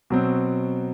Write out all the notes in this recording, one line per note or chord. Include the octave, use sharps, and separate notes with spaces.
B2 F#3 C4